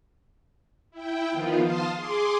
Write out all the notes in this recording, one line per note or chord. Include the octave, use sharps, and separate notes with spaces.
E4 G5
D#3 F3 B3 F4
F5 A5 C6 D#6 F6
G#4 C6 D6